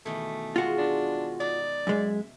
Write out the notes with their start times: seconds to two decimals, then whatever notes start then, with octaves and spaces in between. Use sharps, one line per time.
0.06 B2 D#3 E3 A3
0.56 G#3 F4 F#4
0.78 D4
1.40 D#4 D5
1.87 F#2 G#3 E5